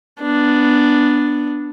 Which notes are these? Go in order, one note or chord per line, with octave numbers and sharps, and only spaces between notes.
B3 D4